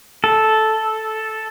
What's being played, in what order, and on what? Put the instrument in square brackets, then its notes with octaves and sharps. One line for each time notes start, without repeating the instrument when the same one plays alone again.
[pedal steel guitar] A4